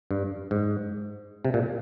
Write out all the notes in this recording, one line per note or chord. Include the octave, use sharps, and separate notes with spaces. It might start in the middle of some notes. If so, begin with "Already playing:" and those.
G2
G#2
C3
A#2